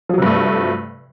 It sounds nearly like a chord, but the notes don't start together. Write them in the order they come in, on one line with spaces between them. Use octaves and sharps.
F3 F#3 C3 G2 A3